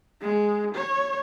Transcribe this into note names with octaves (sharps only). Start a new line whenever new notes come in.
G#3
C#5